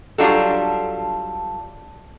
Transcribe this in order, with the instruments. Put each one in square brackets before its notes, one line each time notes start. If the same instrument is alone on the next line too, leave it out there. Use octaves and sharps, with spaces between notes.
[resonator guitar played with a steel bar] F#3 G3 D4 F4 F#4 A4